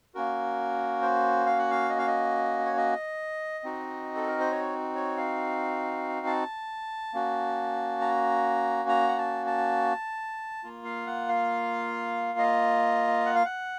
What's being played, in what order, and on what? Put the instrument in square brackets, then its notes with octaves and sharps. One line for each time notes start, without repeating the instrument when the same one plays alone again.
[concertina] A#3 C#4 F#4 A#4
C5
F5
F#5
F5
D#5
F5
D#5
C#5
D#5
C4 D#4 F#4
A4
A#4
C5
C#5
C#5
F5
A5
A#3 C#4 F#4
A#5
A#5
F#5
A5
A5
A#3 F4
F5
F#5
F5
D#5
F#5
F5
F#5